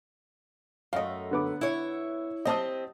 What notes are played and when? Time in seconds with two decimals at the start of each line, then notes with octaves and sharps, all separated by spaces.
0.93 F#2 A3 D#5 F5
1.31 D3 B3 D6
1.61 E4 C#5
2.45 C4 G4 D#5 A5 D#6